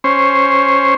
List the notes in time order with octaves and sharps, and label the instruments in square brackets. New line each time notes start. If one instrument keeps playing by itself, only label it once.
[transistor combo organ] C#4 C5